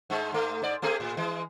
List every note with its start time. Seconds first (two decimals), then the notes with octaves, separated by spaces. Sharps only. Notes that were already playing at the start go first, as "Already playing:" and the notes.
0.10 G#2 G#3
0.32 G#2 A3
0.62 G#2 D5
0.82 A3 C4 G#4
1.00 A2
1.17 E3 G#3